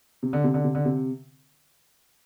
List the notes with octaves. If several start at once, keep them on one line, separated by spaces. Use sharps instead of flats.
C3
D3
C3
D3
C3
D3
C3